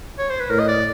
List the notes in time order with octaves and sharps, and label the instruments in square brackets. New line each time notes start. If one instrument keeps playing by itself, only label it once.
[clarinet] C#5
C5
B4
[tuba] A2 [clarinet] A#4
[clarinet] D#5
D5